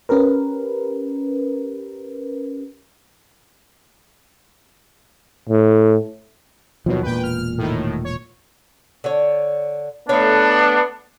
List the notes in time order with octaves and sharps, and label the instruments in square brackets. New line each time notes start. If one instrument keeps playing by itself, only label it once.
[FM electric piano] C#4 G4 A#4 B4
[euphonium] A2
[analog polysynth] D#2 B2 [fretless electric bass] F3 F#3
[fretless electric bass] E1 A#2 [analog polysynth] B4 G5
[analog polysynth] F6
A2 D#3
C#5
[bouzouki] D3 C#5
[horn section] A3 B3 D4 [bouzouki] C#5 F5